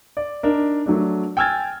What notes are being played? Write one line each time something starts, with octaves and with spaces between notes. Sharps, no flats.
D5
D4 D#4 A#4
F#3 A3 D4
G5 G#5 E6 F6 G#6 A6